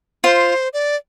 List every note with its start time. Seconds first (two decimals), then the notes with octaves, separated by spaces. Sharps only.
0.24 F4 C5
0.73 D5